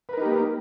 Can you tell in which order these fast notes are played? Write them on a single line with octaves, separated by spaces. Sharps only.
B4 A#4 D#4 G4 A#3